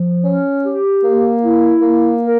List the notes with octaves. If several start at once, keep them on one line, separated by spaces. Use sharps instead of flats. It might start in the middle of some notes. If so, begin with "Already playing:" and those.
Already playing: F3
C#4
G4
A#3
E4
A#3
A#4